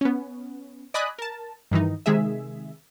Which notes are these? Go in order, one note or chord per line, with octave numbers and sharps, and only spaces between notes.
B3 C#4
D5 D#5 G#5 B5 D#6 F#6
A#4 A5
G2 D#3 E3 D#4
C3 D#3 G#3 G#4 E5